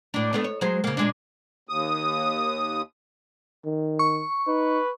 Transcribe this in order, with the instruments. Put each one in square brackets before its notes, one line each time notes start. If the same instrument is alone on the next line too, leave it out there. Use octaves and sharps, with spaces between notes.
[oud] A2 D4
A3 B3 D4
C#5
F#3 G#3 C5
C#3 A#3
A#2 G#3 D4
[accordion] D#2 D#6
[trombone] D#3
[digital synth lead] C#6
[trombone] D#4 [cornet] B4